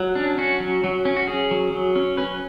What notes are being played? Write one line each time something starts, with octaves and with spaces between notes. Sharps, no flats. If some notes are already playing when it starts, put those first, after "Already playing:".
Already playing: F#3
C#4 D4
C#4 F#4
F#3
F#3
C#4
F#4
C#4 G#4
F#3
F#3
C#4
C#4 B4